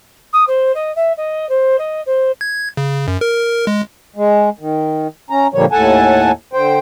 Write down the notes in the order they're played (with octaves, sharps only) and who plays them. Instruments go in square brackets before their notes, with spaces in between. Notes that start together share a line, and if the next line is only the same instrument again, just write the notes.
[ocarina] D#6
C5
D#5
E5
D#5
C5
D#5
C5
[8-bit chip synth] G#6
C#3
F#2
A#4
G#3
[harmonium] G#3
D#3
C#4 A#5
A#2 D3 F3 G3 A#3 C#5
D#2 A2 A4 F#5 G#5 A5
D3 C5 G5